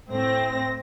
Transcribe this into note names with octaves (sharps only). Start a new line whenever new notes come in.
A2 C4 A#6